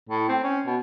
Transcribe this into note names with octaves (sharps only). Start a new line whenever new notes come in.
A2
C4
C#4
B2